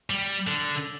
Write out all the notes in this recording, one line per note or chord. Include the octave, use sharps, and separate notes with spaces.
G3
D3